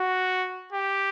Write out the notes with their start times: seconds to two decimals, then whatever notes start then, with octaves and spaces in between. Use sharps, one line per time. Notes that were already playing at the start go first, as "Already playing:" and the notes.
Already playing: F#4
0.73 G4